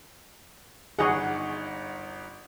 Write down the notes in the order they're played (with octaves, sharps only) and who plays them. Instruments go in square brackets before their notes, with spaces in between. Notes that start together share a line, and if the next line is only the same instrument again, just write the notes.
[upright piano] G1 D#4 F#5 [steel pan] F#4 G#4